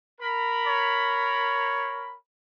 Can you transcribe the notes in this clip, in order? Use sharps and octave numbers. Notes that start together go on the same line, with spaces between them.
A#4 B5
C#5